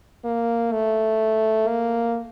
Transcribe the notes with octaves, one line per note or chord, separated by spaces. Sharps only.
A#3
A3
A#3